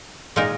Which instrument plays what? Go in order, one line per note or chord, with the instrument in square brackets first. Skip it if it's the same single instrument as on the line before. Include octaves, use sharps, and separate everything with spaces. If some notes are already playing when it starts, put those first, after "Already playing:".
[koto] A#2 G#3 D#4 A#4